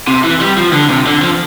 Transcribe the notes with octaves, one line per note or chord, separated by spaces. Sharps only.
C3
E3
G3
F3
D3
C3
D3
F3